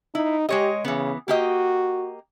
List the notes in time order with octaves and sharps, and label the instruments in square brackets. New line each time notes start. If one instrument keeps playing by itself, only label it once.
[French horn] D#4 [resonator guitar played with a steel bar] E4
[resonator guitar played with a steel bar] G#3 C#5 D#5 [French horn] G4
[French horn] C#3 [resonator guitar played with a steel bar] E3 B3
[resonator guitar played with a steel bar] A#3 G4 D#5 [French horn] F#4